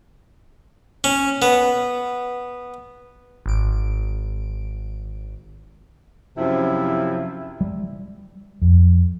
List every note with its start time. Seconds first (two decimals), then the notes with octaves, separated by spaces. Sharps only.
1.04 C#4
1.42 B3
3.46 G#1 D7
6.37 F#2 C3 F3 E4
7.61 G3
8.62 F2